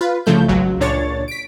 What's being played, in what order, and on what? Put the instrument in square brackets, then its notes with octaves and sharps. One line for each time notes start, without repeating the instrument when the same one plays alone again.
[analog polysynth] F4 B4
C2 C#3 F3 A3 G6
G#1 C#2 F#3
C#2 A#2 D4 C#5 A6
B6 D7